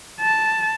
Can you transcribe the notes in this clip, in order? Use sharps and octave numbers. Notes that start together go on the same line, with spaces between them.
A5